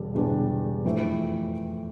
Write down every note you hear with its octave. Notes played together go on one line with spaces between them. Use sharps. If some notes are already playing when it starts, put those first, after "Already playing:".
Already playing: E1 D3 G3 D4
E1 E2 D3 G3 D4
F2 E3 A3 C4